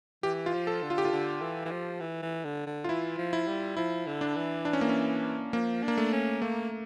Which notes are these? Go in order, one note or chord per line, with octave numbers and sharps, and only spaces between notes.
E3 G4
F4
F3
A4
D3
F4
G4
F4
D3
E3
E3
F3
E3
E3
D3
D3
F4
E3 E4
F3
E4
G3
F3 E4
D3
D4
E3
D4
C#4
A#3
C#4
F3 A#3
D4
A#3
A3
C#4
A3 A#3